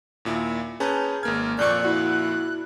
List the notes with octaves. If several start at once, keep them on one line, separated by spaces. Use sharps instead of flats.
D#2 A#2 E4
C#4 G#4 B4 A5 A#5 G6
G#1 A#3 F6 G#6
F2 A#2 D5 C#6 F#6 G6
E4 F#4